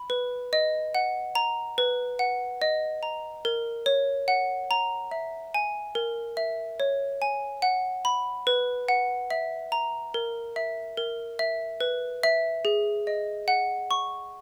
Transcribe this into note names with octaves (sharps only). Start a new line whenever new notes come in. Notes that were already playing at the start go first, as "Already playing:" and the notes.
Already playing: B5
B4
D#5
F#5
A#5
B4
F#5
D#5
A#5
A#4
C#5
F#5
A#5
E5
G#5
A#4
E5
C#5
G#5
F#5
B5
B4
F#5
E5
A#5
A#4
E5
A#4
E5
B4
E5
G#4
D#5
F#5
C#6